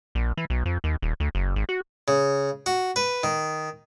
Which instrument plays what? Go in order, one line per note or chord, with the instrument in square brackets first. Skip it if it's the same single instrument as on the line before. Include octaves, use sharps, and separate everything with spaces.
[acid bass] A#1
E3
B1
F2
D#2
D#1
D2
F#1
G#1
F#4
[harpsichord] C#3
F#4
B4
D#3